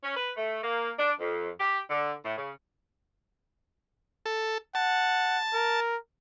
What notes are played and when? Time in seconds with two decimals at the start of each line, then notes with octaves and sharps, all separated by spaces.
0.04 C#4
0.17 B4
0.37 A3
0.64 A#3
0.99 D4
1.20 F2
1.60 G4
1.90 D3
2.25 A2
2.38 C#3
4.26 A4
4.75 F#5 A5
5.54 A#4